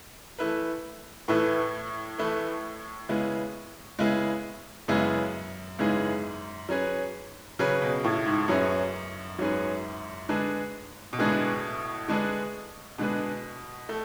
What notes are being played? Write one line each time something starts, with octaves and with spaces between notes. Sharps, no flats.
E3 A3 E4 B4
A2 E3 A3 E4 B4
E3 A3 E4 B4
C#3 G#3 B3 E4 G#4
C#3 G#3 B3 E4 G#4
F#2 C#3 G#3 B3 E4 G#4
G#2 C#3 G#3 B3 E4 G#4
F#3 C#4 G#4 B4
C#3 F#3 C#4 G#4 B4
B2
A2
G#2
F#2 F#3 C#4 G#4 B4
G#2 F#3 C#4 G#4 B4
D3 G#3 D4 G#4 B4
B2
A2 D3 G#3 D4 G#4 B4
D3 G#3 D4 G#4 B4
B2 D3 G#3 D4 G#4 B4
A3